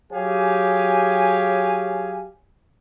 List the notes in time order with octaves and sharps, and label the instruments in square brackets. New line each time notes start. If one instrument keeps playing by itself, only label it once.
[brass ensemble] F#3 G4 G#4 C#5 F5 G#5